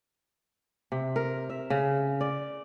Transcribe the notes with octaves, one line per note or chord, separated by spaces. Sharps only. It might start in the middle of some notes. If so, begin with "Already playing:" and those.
C3
A#4
E5
C#3
D5